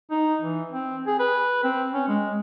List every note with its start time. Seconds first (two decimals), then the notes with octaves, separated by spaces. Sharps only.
0.11 D#4
0.41 E3
0.72 C4
1.07 G#4
1.19 B4
1.64 C4
1.93 C#4
2.08 G#3